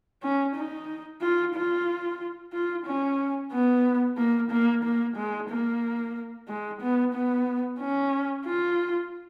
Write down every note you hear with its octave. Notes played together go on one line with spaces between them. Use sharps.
C#4
D#4
F4
F4
F4
C#4
B3
A#3
A#3
A#3
G#3
A#3
G#3
B3
B3
C#4
F4